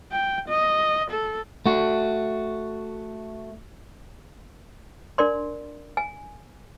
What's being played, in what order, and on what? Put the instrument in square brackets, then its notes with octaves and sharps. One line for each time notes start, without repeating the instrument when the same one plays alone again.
[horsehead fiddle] G5
D#5
A4
[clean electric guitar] A3 F#4
[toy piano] D4 A#4 D5 C6
G#5